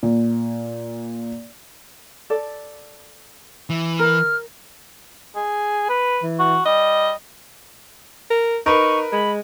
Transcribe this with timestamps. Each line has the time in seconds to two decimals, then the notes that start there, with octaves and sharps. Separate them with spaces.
0.03 A#2
2.30 A4 D5
3.70 E3
3.99 A#4 F6
5.35 G#4
5.89 B4
6.23 E3
6.39 F#4
6.66 G3 D#5
8.31 A#4
8.66 D#4 A#4 B4 C#6
9.12 G#3 B5